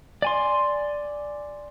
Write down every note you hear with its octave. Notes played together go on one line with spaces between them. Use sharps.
D5 G#5 C6